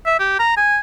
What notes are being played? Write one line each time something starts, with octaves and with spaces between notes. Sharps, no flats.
E5
G4
A#5
G#5